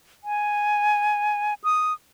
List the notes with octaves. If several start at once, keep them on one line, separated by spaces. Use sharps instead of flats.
G#5
D#6